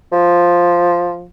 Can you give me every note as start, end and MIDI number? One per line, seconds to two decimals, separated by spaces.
0.12 1.24 53